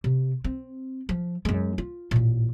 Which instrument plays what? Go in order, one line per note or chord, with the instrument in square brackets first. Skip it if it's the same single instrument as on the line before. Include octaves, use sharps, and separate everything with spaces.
[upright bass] C3
C4
F3
F#2 G#3
F4
A1 A#2